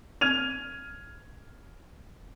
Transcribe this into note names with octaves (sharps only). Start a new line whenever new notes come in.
F6 G#6 D#7 F7